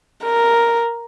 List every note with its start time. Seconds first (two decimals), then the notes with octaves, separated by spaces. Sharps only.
0.24 A#4